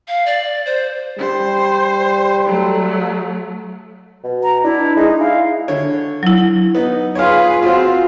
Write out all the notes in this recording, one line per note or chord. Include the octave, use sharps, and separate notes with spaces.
F5
D5
C5
G3 C5
F#3 A3
B2
A#5
D4 E4
G#3 D#4
E4 F5
D3 C#5
F#3 E4
B3 D#4
F4 G#4 B4 C#5 F5
C4 F4 F#4